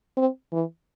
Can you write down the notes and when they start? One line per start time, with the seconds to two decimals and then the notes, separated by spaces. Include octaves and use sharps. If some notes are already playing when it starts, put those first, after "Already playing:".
0.17 C4
0.52 E3